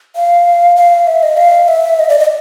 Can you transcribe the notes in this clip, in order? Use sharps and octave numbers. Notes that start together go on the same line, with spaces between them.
F5
F5
E5
D#5
F5
E5
D#5
D5
D#5